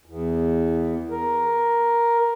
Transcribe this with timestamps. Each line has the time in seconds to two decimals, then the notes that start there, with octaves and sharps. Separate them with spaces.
0.06 E2
1.11 A#4